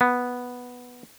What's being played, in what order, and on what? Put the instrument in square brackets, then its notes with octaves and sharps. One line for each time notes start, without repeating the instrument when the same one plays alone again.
[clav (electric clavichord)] B3